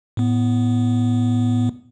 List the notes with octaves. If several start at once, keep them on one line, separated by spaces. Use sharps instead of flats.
A2 B3